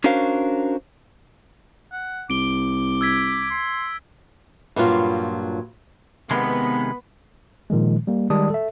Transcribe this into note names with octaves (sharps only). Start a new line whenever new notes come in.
C#4 D4 F#4 A#4 C5 F5
F#5
C2 D6 D7 G7
E6 G#6 B6
C6
G2 A#2 F#3 F4
C3 D#3 G#3 B3 B5
A#2 D#3 F3 G#3
G3 A#3
D#3 G3 G#3 D5 A5 D#6
A4 E5